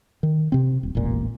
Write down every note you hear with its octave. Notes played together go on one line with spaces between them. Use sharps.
D#3
C3 C4
D#1
E1 A1 A#2